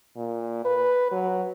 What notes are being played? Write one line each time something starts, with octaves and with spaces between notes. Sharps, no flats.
A#2
B4
F#3